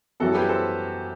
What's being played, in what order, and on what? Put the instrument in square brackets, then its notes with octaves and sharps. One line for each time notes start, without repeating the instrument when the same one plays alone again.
[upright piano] F#2 E3 G3 B3 [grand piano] F#4 A4
[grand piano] G4 B4
A4 C5